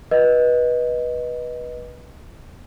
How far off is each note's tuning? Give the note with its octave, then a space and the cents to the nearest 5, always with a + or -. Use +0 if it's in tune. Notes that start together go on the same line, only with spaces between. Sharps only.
B4 -20 D#5 +0